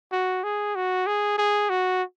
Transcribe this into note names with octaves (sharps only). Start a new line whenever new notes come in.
F#4
G#4
F#4
G#4
G#4
F#4